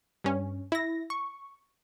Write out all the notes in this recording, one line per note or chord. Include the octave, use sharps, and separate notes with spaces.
G2 C#4
E4 A#6
C#6